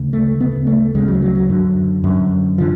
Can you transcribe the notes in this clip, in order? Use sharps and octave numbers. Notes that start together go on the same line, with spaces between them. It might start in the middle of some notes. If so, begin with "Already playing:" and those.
Already playing: D2 C#3
A3
D2 C#3 B3
A3
D2 C#3 G#3
F#3
F#3
F#3
F#2 D3
F#2 D3
D3 F3